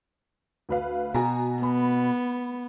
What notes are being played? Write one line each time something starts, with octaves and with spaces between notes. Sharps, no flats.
D2 B4 F5
B2 F#4 G#5 A#5
B3 B5